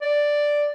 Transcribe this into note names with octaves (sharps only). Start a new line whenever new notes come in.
D5